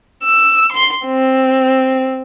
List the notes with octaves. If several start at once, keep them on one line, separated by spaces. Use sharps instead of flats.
E6
C6
C4